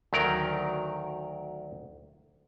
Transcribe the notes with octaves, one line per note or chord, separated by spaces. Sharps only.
D2 D#3 F#3 A#4 D5 G5